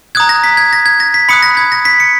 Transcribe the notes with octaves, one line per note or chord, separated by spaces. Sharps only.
A#5 D#6 F#6 G#6
A#6
B6
G#6
A#6
G#6
A#6
B6
B5 D#6 F#6 C#7
A#6
G#6
A#6
B6
C#7